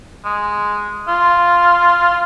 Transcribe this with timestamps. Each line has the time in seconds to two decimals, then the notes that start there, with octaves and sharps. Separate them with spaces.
0.25 G#3
1.08 F4